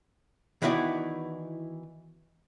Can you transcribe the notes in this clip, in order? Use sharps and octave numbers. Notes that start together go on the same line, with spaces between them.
D#3 E3 B3 E4 F#4 D5